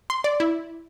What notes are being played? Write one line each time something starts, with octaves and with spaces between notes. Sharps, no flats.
C6
D5
E4